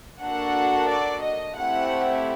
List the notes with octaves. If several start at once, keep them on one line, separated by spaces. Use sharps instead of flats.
A#3 D4 F#4 A4 F#5
D5
D#5
A3 C4 E4 G4 F#5